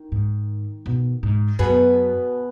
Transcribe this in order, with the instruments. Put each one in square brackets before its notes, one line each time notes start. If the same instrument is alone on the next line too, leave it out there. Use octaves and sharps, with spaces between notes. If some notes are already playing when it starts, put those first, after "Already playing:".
Already playing: [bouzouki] D#3
[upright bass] G#2
B2
G#2
[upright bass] F#2 [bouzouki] B2 B3 G#4 B4